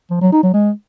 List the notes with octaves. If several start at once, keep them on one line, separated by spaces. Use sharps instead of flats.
F3
F#3
D#4
F#3
G#3